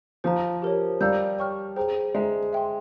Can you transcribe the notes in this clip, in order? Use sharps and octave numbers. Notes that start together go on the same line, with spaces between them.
F3 C5 F5 A#5
G4 A#4 C#5
G3 F5 A#5 E6 G6
C#5 G5 C#6 F6
G#4 C5 G5 A#5
G#3 C5 E5 A#5
E5 G5 C6